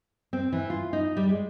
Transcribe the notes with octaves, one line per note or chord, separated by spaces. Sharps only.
C4
E3
F4
D#4
G3
G#3